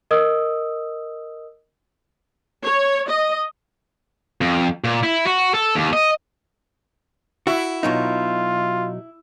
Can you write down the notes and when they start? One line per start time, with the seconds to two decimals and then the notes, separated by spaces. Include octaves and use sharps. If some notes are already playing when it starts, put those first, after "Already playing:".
0.11 A#4 D#5 D#6 E6
2.63 C#5
3.09 D#5
4.41 F2
4.84 A#2
5.03 E4
5.27 F#4
5.54 A4
5.75 D#2
5.93 D#5
7.47 E4 F#4
7.83 B2 F#3 D#4 F4